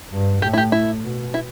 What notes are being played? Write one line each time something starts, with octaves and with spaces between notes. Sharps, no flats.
G2
A2 G4
E4
G4
E4
B2
E4